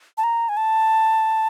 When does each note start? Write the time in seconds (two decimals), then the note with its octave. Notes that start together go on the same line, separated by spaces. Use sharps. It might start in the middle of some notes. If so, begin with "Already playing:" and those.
0.18 A5
0.24 A#5
0.49 G#5
0.57 A5